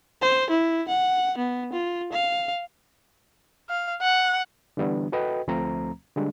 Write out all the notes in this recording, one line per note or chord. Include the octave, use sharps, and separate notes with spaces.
C5
E4
F#5
B3
F4
F5
F5
F#5
D3 E3 G3 B3 D4
F#4 A4 B4 D#5 G5
D2 F3 A3 C4 A#5
D3 G3 G#3 D4